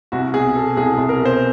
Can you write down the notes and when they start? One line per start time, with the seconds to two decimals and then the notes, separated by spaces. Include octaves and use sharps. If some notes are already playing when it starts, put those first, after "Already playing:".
0.12 C2 F#4
0.34 B2 G#4
0.56 B2 A4
0.77 C2 G#4
0.93 G#4
0.98 C2
1.09 A#4
1.20 B2
1.25 C5